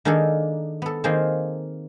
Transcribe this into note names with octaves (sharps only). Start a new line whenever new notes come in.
D#3 A#3 D4 D#4 G#4 A4
B3 A4
D#3 A#3 C4 F4 G#4 C5